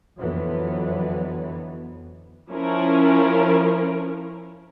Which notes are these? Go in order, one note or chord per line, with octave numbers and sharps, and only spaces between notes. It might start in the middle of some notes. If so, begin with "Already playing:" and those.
F2 D3 E3 F#3 B3
F3 C#4 E4 A#4